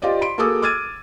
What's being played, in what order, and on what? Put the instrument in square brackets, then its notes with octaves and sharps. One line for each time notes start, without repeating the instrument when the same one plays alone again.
[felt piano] F4 G4 C5 D5 D#5
B5 C6 D7
A#3 F#4 G#4 A4 D6 D#6
D6 E6 F6 G#6 A6 D#7